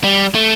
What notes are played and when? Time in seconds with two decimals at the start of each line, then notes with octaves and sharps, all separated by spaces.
0.04 G3
0.35 A3